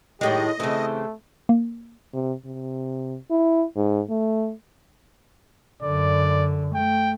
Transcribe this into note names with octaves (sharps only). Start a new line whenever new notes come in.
F#2 A2 D#3 G#3 A3 G4 D#5
C#3 E3 A3 C4 G4
A#3
C3
C3
E4
G#2
A3
F#2 D3 D5
A3 G5